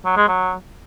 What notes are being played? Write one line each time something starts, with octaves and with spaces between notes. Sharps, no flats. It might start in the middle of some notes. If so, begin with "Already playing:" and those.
F#3
G#3
F#3